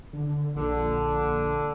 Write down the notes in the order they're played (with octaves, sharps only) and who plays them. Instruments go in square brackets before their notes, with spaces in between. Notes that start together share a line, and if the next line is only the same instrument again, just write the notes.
[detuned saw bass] D3
[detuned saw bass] A#1 [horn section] D3